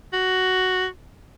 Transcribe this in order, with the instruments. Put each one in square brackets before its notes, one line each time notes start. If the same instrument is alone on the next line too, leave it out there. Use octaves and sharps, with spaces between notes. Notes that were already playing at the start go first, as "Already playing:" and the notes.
[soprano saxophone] F#4